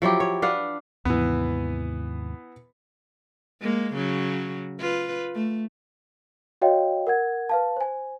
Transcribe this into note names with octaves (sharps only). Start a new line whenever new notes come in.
F3 F#3 E4 G4
C#5
D4 B4 F5 F#5
D#2 G#2 C3 E3 B3
G#3 A#3
C#3 F#3
F4 B4
A3
F#4 C#5 D#5 F5 G5
A#4 F#5 G#6
B4 F5 A5
C5 G#5